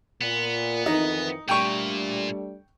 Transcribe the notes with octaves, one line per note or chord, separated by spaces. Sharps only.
A#2 B3
F2 D#3 E3 D#4
A#2 G3 A3 D4 G5 C#6